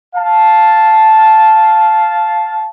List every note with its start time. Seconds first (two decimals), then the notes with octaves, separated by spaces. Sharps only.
0.15 F5 A5